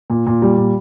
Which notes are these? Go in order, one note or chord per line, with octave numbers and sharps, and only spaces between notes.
A#2
A#2
G3
A#2